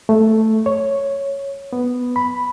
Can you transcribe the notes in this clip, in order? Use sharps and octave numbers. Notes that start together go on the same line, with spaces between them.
A3
C#5
B3
B5